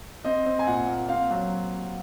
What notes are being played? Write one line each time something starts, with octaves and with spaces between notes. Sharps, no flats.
C4 D#5
C4
G#5
A#2 F#5
A#3
C4 F5
F#3